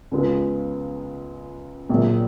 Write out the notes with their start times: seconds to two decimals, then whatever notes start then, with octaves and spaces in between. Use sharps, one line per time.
0.11 C#2 C#3 G#3 B3 F4
1.89 A#1 A#2 F#3